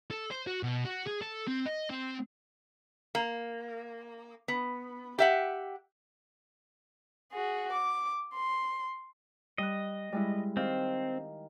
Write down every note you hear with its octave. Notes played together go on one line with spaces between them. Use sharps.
A4
C5
F#4
B2
F#4
G#4
A4
C4
D#5
C4
A#3
B3
G4 E5 F#5
F#4 G#4
D6
C6
G3 D#5 F#6
G3 G#3 E4
D#3 C4 G4 F5